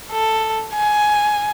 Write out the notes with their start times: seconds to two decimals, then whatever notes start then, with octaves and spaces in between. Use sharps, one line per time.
0.12 A4
0.74 G#5